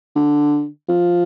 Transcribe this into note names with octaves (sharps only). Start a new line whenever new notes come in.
D3
F3